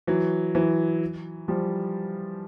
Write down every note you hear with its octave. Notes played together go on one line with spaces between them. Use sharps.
E3 F#3
E3 F#3
F3 G3